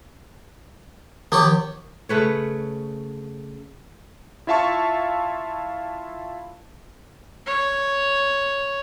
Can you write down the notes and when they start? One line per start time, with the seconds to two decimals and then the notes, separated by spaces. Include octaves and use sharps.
1.32 D#3 F3 B3 G4 C#5
2.09 C#3 A3 B4 C#5
4.47 E4 F4 E5 F5 A5 C#6
7.46 C#5